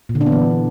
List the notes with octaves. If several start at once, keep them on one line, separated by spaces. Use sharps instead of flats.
A#2
D3
D4
B3
E3